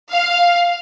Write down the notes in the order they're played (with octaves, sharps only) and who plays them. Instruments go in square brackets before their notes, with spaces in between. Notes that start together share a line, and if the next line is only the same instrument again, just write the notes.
[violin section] F5